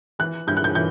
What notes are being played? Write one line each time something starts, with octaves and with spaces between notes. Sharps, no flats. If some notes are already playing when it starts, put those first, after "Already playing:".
E3 F#6
G2 G6
F#6
G6
E3 G6